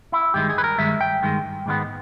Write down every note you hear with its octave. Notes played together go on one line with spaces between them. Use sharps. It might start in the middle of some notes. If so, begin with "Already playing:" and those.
E4
G2 D#3 G#3 G4
G#4
B4
A#4
G2 D#3 G#3 E5
G5
G2 D#3 G#3
G#2 D#3 G#3 B3